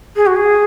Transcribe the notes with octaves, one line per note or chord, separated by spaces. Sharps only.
G#4
F#4
G#4